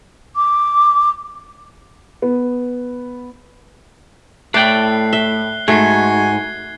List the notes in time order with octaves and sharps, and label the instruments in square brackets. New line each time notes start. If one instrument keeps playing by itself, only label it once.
[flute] D6
[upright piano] B3
[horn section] A2 [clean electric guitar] A3 G5 [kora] D5 [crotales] F#6 C7
[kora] E5 [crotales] G7
[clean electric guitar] G#2 [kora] A3 [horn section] F#4 G#5 [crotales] G#6 C7